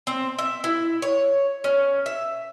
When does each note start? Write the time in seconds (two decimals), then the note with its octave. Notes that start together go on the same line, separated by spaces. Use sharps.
0.07 C4
0.39 E5
0.64 E4
1.02 C#5
1.64 C#4
2.06 E5